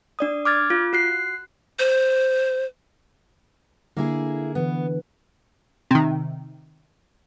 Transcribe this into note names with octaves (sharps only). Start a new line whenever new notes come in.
D4 D5 D#6
D6 F6 G#6 A6
F4
F#4 F#6 C7
C5
D3 A#3 E4 G#4
D3 E3 B3 B4
C3 D#3